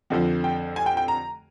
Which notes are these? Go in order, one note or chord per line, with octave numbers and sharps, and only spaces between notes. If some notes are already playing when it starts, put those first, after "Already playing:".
F2 D3 F3
G5
G#5
G5
G5
A#5